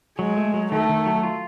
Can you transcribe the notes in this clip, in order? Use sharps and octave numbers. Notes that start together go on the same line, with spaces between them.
F#3 G#3
A3
F#3
D#3 A3
D#3
F#3
F4